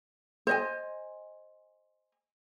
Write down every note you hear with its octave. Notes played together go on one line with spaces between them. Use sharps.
C5 D#5 G#5